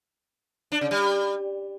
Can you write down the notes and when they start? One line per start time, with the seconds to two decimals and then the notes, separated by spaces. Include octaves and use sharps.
0.72 D4
0.81 C#3
0.91 G3